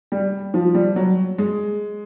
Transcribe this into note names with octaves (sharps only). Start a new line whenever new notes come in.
G3
F3
G3
F#3
G#3